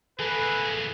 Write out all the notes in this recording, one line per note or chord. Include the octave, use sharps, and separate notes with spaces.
E3 A#3 G#4 A4 B4